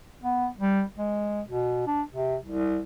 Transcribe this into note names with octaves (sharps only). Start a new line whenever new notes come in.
B3
G3
G#3
B2
D4
C3
C2